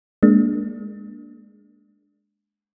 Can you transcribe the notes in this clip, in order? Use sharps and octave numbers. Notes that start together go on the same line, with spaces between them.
G#3 A#3 D4